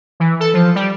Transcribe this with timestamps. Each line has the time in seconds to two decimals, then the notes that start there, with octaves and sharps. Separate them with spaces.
0.20 E3
0.40 A4
0.54 F3
0.75 G3